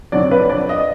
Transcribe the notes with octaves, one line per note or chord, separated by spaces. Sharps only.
F2 D3 F#3 D5
B4
D5
D#5